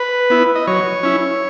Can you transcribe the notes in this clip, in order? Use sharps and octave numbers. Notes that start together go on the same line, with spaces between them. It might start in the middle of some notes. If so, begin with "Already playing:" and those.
Already playing: B4
B3 E4
D#5
F#3 C#5
C#4 E4